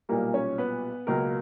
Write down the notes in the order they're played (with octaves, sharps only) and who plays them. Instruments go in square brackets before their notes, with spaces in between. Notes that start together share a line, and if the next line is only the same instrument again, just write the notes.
[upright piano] B1 A#2 G3 A#3 A#4
C#4 C#5
B3 B4
C#2 B2 F#3 A#3 A#4